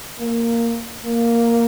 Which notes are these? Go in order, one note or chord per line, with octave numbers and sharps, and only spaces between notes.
A#3
A#3